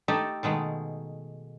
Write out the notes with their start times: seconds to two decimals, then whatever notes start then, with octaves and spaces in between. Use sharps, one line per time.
0.08 A3 D#4 G4 A4
0.43 B2 D#3 G#3 A3